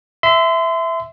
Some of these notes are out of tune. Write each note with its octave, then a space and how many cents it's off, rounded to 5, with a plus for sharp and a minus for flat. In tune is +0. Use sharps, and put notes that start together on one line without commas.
E5 +0 C6 -35